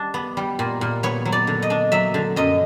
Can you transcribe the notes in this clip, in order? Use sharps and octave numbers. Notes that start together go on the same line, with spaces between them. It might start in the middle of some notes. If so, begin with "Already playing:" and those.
Already playing: G3 D4
B3
G3
A#2
A#2
B3 C#5
F#3
D5
D3
D#5
D4
F#3 E5
D3
F#2 D#5